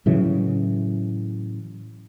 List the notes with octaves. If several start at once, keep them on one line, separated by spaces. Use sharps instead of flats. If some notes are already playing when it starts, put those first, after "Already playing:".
A2 C#3 E3 F#3